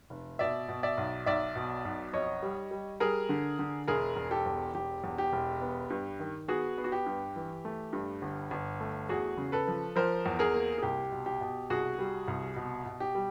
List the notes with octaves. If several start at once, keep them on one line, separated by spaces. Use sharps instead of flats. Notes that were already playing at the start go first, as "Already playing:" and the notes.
F1
B2 D5 E5
B2
D5 E5
B1
B1 D5 E5
B2
B1
F2 C#5 D#5
G3
G3
G3 G#4 A#4
D3
D3
E1 G#4 A#4
E1
G4 A4
E2
E1 G4
E2
G4
E1
B3
G2
D#3
B3 F#4 G#4
B3
F#4
G4
G2
E3
A3
G2
G1
G1
A3
E2 F#4 G#4
C#3
A4 B4
F3
F3 A#4 C5
E2
G#4 A#4
A#3
G#4
C2 G4
B2
G4
B2
C2 F#4 G#4
G3
C2
B2
B2
G4
G3